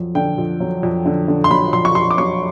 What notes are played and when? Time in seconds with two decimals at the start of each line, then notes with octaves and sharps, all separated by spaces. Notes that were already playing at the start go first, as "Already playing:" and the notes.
Already playing: F2 F#3
0.15 D3 G5
0.38 F2
0.60 F#3
0.83 F2
1.06 D3
1.28 D3
1.44 C6
1.50 F#3 B5
1.73 F2 C6
1.85 C#6
1.95 F2 C6
2.11 D6
2.18 F#3 C#6